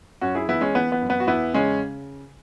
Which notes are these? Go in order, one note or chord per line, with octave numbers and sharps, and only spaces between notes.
F#2 C#4 F#4
E4 G#4
E3 B3 E4
G#3 C#4
E3 B3
B3
F#2
B3
F#4
E2 B3 E4
C#3 G#3 C#4